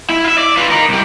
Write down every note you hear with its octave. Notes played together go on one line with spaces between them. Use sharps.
E4
E5 F5
D5
F4 B4
A#4 D#5
C2 G4